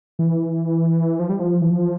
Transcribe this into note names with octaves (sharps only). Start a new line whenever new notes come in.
E3
F3
G3
F3
E3
F3